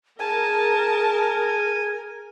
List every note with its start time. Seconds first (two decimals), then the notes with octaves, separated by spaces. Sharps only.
0.20 G#4 A#4 G#5 A5